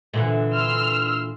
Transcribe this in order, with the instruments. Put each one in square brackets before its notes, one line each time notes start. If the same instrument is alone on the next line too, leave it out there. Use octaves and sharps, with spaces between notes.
[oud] A#2 D3 E3
[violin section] C6 E6 F6